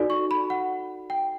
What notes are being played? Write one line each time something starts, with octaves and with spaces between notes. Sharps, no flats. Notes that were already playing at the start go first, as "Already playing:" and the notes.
Already playing: D#4 F#4 A4 D5
C#6
B5
F#5
G5